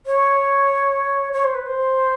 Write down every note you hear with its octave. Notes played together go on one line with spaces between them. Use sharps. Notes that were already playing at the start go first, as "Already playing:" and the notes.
C#5
C#5
C5
B4
C5